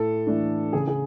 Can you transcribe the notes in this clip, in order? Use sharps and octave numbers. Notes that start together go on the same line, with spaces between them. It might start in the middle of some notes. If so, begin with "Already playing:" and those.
Already playing: A2 A4
E3 A3 D4
C#3 G#4
G#4